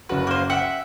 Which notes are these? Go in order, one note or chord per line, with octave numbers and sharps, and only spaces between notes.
F#1 F#4 B4
A#3 C5
E5 F#5 G5